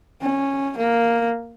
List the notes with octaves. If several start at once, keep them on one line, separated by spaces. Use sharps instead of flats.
C#4
A#3